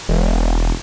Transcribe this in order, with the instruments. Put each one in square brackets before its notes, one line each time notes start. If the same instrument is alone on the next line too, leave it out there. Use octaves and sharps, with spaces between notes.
[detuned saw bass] E1